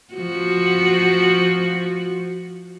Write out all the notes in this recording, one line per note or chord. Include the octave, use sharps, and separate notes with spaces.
F3 F#4